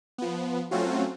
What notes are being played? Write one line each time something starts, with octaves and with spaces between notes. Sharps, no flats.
F3 B3
F#3 A3 C4 C#4 F4 F#4